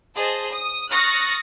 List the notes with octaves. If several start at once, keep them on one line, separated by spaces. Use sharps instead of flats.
G#4 C5 D#5 A5
D#6
C#6 D#6 F6 F#6 A6 A#6